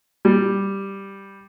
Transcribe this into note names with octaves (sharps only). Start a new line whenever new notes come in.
G3